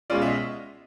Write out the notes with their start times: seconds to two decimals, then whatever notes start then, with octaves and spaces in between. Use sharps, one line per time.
0.10 B2 G#3 C#4 F4 D5
0.22 E5
0.26 D#5